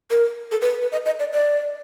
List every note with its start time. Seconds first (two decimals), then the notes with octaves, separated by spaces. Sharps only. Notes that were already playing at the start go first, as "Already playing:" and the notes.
0.11 A#4
0.52 A4
0.61 B4
0.82 B4
0.92 D#5
1.06 D#5
1.19 D5
1.33 D5